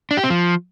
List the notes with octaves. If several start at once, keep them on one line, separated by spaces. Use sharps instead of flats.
D4
G4
C4
F3